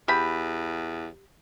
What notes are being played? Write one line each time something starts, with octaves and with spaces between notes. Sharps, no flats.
E2 G4 B5